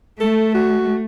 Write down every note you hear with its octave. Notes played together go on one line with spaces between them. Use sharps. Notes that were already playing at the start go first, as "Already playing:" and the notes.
A3 A4
F#4